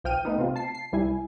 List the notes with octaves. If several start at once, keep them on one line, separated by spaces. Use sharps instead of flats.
B1 F3 G5 F6 D#7
A3 B3 D#4
C3 C4 F4
A5 C7
C7
C2 G3 E4 G#5